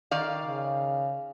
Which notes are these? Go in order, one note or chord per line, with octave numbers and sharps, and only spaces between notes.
D#3 D5 F5
C#3